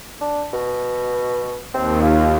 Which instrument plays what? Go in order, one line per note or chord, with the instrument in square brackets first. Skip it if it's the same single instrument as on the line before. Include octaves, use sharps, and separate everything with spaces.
[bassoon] D4
B2
[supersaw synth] D#2 [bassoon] C4
[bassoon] F4